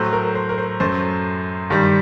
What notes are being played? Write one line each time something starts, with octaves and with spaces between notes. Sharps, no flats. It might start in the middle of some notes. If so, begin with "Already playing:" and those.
Already playing: A2 F#3 A3 C5
A#4
C5
A#4
C5
F#2 F#3 A3 C5
G2 D#3 G3